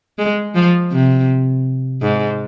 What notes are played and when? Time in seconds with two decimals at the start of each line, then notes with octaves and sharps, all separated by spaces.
0.18 G#3
0.55 F3
0.92 C3
2.02 G#2